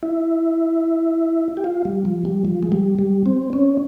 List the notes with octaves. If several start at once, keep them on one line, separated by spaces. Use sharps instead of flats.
E4
G4
F4
G3
F3
G3
F3
G#3
G3
G3
C4
C#4